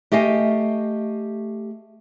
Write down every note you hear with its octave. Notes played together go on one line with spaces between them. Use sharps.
A3 G4 D#5 F5 G#5